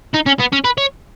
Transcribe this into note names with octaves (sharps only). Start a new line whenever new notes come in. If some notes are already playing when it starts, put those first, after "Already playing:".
D#4
C#4
B3
C#4
B4
C#5